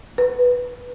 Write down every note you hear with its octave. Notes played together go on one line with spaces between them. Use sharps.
B4